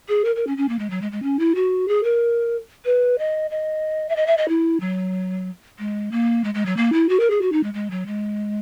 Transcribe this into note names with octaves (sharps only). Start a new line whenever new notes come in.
G#4
A#4
A#4
C#4
C#4
A#3
G#3
F#3
G#3
G#3
C#4
E4
F#4
G#4
A#4
B4
D#5
D#5
E5
D#5
E5
D#5
E4
F#3
G#3
A#3
G#3
G#3
F#3
A#3
E4
F#4
A#4
G#4
F#4
D#4
G#3
G#3
F#3
G#3